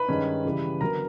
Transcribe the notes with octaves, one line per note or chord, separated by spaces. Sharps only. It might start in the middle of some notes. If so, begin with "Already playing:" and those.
Already playing: B4 B5
G2 D#3 G#3 C#4
C#3 E3 G3
D3 F#3 B3 A#4 A#5